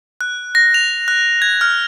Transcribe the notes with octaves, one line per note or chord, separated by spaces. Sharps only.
F#6
A#6
F7
F#6
G#6
F6